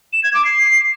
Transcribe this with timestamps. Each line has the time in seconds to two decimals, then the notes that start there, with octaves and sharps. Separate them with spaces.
0.13 E7
0.24 G#6
0.34 D6
0.45 C7